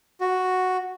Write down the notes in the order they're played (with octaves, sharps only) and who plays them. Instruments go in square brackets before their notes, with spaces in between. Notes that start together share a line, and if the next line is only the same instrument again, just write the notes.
[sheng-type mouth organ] F#4